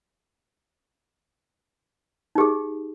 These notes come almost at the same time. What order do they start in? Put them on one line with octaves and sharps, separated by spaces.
D#4 G4 G#4